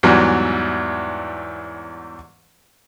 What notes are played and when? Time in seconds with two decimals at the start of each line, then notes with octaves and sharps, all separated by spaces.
0.03 E2 G#2 F#3 G3